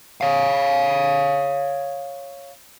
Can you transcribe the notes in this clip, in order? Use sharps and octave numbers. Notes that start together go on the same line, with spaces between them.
C#5 F5